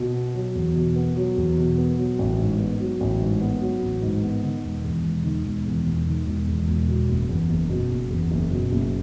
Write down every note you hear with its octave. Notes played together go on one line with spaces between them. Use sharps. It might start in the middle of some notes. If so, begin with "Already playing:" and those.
Already playing: B2
B3
F#3
E2
B2
B3
F#3
E2
B2
B3
F#3
A1
G#2
B3
F#3
A1
G#2
B3
F#3
A1
G#2
B3
D#3
E1
E2
E1
D#3
E1
E2
E1
D#3
E1
E2
E1
B2
F#1
E2
F#1
B2
F#1
E2
F#1
B2
F#1